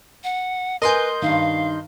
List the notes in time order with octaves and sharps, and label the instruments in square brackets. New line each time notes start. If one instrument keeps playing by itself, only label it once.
[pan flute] F#5
[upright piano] A#4 G#5 [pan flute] B4 [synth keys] D#5 C6 G6
[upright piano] G2 D#3 [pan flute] F5